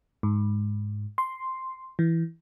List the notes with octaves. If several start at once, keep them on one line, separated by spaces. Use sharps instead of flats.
G#2
C6
E3